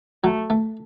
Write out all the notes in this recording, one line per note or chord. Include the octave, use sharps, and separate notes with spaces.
F#3 A3
A3